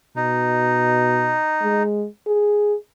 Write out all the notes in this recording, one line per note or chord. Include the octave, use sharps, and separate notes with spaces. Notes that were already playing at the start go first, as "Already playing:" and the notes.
B2 D#4
G#3
G#4